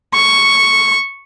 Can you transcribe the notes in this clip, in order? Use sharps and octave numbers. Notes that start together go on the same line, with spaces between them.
C#6